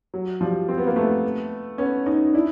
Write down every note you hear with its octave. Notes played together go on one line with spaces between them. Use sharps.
F#3
F3 G3
C4
B3
A#3
A3 B3
B3 C#4
C#4 D#4
D4 E4